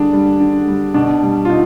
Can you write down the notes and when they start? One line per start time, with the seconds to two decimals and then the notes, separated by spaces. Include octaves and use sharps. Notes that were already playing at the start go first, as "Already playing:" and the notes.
Already playing: D3 G3 D4 G#4
0.13 G3
0.40 D3
0.68 G3
0.94 B2 D4
1.23 G3
1.45 F4
1.49 B2 D#4